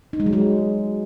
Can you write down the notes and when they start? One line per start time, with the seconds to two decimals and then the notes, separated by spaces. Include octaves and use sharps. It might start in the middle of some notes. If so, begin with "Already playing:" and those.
0.13 D#4
0.20 G#3
0.26 F#3
0.33 G#3